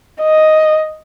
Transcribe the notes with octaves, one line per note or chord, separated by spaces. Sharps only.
D#5